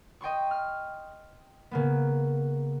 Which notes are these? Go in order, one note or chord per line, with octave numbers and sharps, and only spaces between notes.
D#5 G5 C6 C#6
F6
C#3 A#3 B3